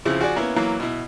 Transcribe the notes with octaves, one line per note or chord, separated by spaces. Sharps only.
C#3 F3 C4 E4
F3 F#4 G#4 D5
A#3 B3 C#4 E4
E3 F#3 A#3
B2 E4